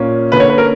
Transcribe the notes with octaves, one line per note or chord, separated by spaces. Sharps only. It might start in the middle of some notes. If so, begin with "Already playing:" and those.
Already playing: A#2 A#3 C#4
D3 A#3 C#4 B4
C#5
B4
A#4